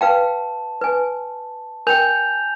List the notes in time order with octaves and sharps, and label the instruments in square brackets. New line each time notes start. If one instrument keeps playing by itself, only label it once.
[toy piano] B4 F5 G5 [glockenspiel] A5
[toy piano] B4 G#5
[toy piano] A#4 G5 [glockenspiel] G#5 G6 F7